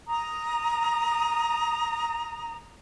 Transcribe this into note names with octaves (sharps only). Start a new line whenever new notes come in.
A#5 D#6